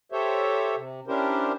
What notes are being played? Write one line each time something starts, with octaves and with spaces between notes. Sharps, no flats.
G4 A4 C5 C#5 E5
C3
C#4 D4 E4 G4 A#4 C5